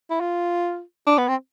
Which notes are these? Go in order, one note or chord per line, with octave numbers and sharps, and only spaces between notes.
E4
F4
D4
B3
C4